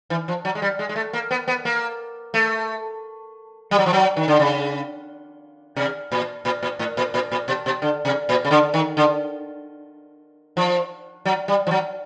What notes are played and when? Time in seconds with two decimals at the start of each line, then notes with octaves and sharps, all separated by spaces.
0.10 E3
0.28 F3
0.45 F#3
0.55 G#3
0.62 G3
0.79 G#3
0.89 G#3
0.96 A3
1.13 A#3
1.31 B3
1.48 B3
1.65 A#3
2.34 A3
3.71 G3
3.79 F#3
3.86 F3
3.93 F#3
4.16 D#3
4.28 D3
4.39 C#3
5.76 C3
6.12 A#2
6.45 A#2
6.63 A#2
6.79 A2
6.97 A#2
7.14 A#2
7.32 A#2
7.48 B2
7.66 B2
7.82 D3
8.05 C3
8.29 A#2
8.45 C#3
8.51 D3
8.74 D#3
8.97 D3
10.57 F3
11.25 F#3
11.48 G3
11.67 F3
11.71 F#3